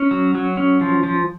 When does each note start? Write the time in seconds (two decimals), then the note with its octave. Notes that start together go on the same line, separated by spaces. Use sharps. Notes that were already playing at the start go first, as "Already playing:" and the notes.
Already playing: C#4
0.11 F#3
0.35 F#3
0.57 C#4
0.81 F3
1.03 F3